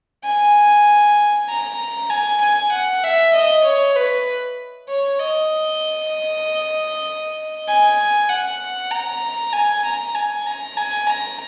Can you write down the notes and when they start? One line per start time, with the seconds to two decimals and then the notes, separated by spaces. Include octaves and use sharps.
0.24 G#5
1.49 A#5
2.09 G#5
2.41 G#5
2.72 F#5
3.03 E5
3.33 D#5
3.64 C#5
3.96 B4
4.88 C#5
5.19 D#5
7.67 G#5
8.29 F#5
8.91 A#5
9.53 G#5
9.85 A#5
10.15 G#5
10.46 A#5
10.77 G#5
11.08 A#5